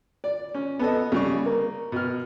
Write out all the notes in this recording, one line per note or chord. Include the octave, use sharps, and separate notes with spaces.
D5
C#4
B3 A4 D#5
C#3 G3 C#6
A#3
B2 F6